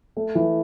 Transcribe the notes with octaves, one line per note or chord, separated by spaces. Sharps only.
A3
E3